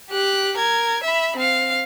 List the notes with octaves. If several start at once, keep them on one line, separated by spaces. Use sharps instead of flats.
G4 F#6
A#4 G#6
E5 B5
C4 F5